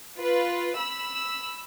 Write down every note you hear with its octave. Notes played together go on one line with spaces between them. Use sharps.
F4 B4
B5 E6